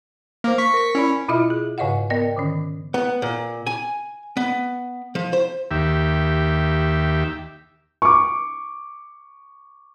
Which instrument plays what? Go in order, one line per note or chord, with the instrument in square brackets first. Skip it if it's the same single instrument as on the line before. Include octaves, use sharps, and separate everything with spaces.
[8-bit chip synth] A#3 [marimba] C5 D6 F6
[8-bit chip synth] C#6 B6
[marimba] A#4
[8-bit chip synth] C#4 [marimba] E4 D5 B5
[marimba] B2 E4 F4 D#5 E5 F6
G#4
G#2 C#3 C#5 D#5 F5 F#5
B3 A#4 D5 D#5 G5
D3 D#3 C#4
[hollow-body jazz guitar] B3
A#2
G#5
B3
F3
C5
[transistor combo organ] D#2 G4 E5
[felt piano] C#6 D6